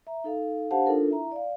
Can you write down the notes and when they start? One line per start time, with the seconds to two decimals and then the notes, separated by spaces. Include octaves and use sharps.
0.07 E5 A#5
0.24 D#4 A4 F5
0.71 D4 G4 C5 F5 F#5 A5
0.86 D4 D#4 F4 A4 A#4
1.08 E4 E5 A#5
1.32 D5 F5